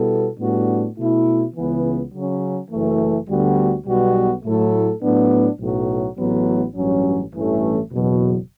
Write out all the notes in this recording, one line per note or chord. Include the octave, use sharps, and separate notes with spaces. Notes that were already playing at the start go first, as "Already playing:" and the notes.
Already playing: B2 G3 B3 E4 A4
A2 G3 B3 D4 F#4
B2 A3 E4
C#2 C#3 E3 B3
C#3 F#3 C#4
F#1 F#2 E3 A3
D2 D3 G3 B3 F#4
B1 B2 G3 B3 F#4
A2 F#3 A3 E4 A4
A2 F#3 B3 D4
B1 A2 F#3
A1 A2 F#3 B3
A1 G2 F#3 C#4
A1 G2 E3 A3 C#4
F#1 E2 B2 F#3